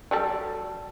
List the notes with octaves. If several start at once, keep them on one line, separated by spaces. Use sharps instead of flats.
F#3 G3 A4